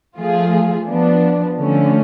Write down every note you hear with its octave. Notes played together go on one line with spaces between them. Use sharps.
F3 A3 F4 G#4
F3 B3 D4
D3 F3 A3 C#4